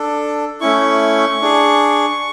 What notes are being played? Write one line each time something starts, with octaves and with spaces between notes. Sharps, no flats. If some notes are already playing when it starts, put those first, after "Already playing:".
Already playing: D4 A4
A3 C#4 E4 C#6
D4 G#4